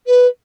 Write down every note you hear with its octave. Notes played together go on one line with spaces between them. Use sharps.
B4